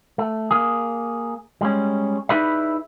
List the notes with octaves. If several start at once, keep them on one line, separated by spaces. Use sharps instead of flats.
A3
A#3 G#4
G3 G#3 C#4
D#4 E4 G#4 B4 D5 E5